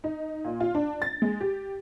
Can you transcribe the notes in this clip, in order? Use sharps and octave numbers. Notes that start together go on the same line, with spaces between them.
D#4
A#2
F4
D4
A6
G#3
G4